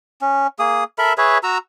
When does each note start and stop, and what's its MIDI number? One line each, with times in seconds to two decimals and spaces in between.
0.22 0.47 61
0.59 0.84 58
0.59 0.84 68
0.59 0.84 87
0.98 1.13 69
0.98 1.13 70
0.98 1.13 76
0.98 1.13 83
1.18 1.38 68
1.18 1.38 71
1.18 1.38 73
1.18 1.38 76
1.43 1.58 66
1.43 1.58 82
1.43 1.58 88